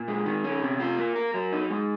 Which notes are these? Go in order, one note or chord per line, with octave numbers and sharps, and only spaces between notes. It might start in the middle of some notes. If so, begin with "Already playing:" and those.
Already playing: A#2
G#3
D#3
C#4
C3
F4
A#3
A#4
F#3
D#4
G#3